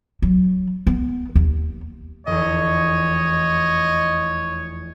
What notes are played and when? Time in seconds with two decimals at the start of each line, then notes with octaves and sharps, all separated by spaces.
0.22 F#3
0.87 B3
1.35 D#2
2.27 F1 E2 C#5 D#5